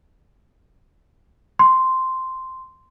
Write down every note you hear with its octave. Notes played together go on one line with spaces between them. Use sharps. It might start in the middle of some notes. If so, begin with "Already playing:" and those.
C6